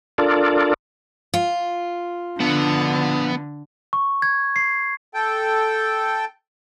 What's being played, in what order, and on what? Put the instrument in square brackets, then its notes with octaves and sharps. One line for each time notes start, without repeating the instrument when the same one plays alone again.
[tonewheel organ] D4 F4 A4 A#4 D5
[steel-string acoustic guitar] F4
[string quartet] D3 [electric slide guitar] F3 D4 F#5 [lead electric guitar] B3
[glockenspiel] C#6
G#6
C7
[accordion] A4 G5